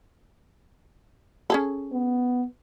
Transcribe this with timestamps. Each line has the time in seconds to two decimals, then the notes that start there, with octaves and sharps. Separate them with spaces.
1.50 C#4 G#4 A4
1.92 B3